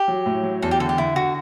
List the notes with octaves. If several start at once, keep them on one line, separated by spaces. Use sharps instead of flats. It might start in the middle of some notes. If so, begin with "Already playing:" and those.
Already playing: G4
F#3
A2
F#3
E2 A4
G4
D3 A4
G4
D3 E4
D3 F#4